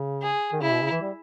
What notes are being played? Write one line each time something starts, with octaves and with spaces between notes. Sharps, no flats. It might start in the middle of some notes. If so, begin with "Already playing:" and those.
Already playing: C#3
G#4
D#3
C#3 E4
B2
C#3
E3
G3